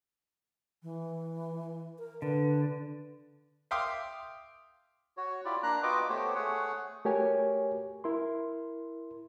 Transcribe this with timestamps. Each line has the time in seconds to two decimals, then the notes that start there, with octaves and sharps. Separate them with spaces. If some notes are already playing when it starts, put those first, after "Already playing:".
0.83 E3
1.98 A#4
2.22 D3 B4
3.71 E5 F5 G5 C6 D6 D#6
5.17 F#4 C#5
5.45 E4 F4 G4 D5
5.63 A#3 D4 A#5 F#6
5.83 F4 F#4 B4 D#5 G5 D6
6.09 A3 B3 G4 C5 C#5
6.35 A3 G#4 C#5 F#5
7.05 A3 F#4 G4 A#4 C#5 G#5
8.04 E4 A#4 C6